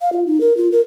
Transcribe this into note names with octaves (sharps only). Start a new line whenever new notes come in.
F5
F4
D#4
A#4
F4
A#4